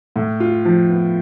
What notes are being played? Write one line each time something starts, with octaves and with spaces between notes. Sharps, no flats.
A2
F4
F3
B3